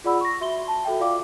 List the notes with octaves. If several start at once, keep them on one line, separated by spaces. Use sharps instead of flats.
F4 G#4 D5 F#5 B5 E6
C#6 A#6
F#4 E5 C6 G7
A5
F#4 A4 E5 G5
F4 D5 F5 D6